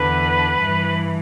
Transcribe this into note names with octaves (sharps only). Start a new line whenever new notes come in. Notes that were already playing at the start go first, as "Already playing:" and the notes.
Already playing: E2 D3 B4
G2 E3